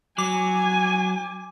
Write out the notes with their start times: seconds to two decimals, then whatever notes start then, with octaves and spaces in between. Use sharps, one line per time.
0.18 F#3 G#5 D6